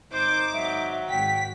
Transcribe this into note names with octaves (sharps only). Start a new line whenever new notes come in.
G#1 D#4 C5 D6
F#3 E5
G#1 G5 B6